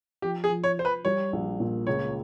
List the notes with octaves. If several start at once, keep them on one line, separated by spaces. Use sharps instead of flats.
F3 G4
G#4
F3
C#5
F3 C5
B4
G3 C#5
A#1
A#2
C#2 C#5